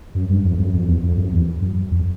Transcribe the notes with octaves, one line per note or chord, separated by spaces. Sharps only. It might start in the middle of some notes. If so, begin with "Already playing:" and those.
F#2
G2
F2
F#2
F2
E2
F2
F#2
E2
F#2
F2